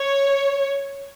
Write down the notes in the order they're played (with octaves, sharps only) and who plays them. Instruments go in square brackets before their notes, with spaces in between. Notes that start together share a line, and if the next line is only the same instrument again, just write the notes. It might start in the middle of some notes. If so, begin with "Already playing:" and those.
Already playing: [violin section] C#5